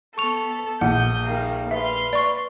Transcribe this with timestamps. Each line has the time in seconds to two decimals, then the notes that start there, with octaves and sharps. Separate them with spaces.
0.18 B3 A4 C#6 F7
0.81 A#1 F#5 D#6 G6
1.28 D#3 G3 A#3
1.71 B4 E5 F5 C6
2.13 D5 C#6